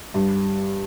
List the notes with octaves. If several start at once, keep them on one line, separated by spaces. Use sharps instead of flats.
G2